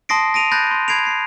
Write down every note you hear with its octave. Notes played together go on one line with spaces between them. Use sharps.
A5 C6 D#6 A#6 C7 D7
A#6 D7 D#7 F7
B5 F#6 G6 A6 A#6
C6
B5 G#6 C7 D7 F7
C7